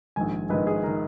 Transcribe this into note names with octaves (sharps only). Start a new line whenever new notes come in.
A#1 G#2 D#3 G#5
A#1 G#2 D#3 B4
G#4
D#3 A#4